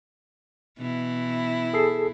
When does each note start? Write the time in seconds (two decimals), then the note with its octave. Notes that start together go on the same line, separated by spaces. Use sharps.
0.78 B2 E3 E4
1.73 G#4 A4 C7